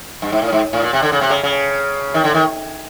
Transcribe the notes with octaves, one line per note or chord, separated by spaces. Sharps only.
G2
G#2
A2
G#2
A2
A#2
C3
D3
C#3
C3
C#3
C#3
D#3
D3
D#3